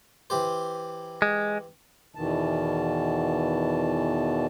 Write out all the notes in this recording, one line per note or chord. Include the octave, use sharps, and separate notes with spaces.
E3 G4 C5
G#3
E2 B2 D#3 E3 A5